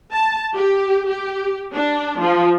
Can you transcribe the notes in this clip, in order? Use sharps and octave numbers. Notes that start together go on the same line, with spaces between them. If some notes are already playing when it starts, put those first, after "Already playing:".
A5
G4
G4
D4
F3